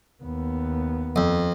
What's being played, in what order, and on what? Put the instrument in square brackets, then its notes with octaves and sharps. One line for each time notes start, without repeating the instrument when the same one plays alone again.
[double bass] D#2 B3
[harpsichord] F2